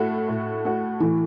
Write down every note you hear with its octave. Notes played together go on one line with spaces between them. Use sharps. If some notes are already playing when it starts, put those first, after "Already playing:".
Already playing: A2 A3 F#4
A2
A3 F#4
A2 E3